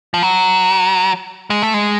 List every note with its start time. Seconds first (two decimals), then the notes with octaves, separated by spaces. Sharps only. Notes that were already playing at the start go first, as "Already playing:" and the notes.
0.14 F3
0.22 F#3
1.50 G#3
1.62 A3
1.74 G#3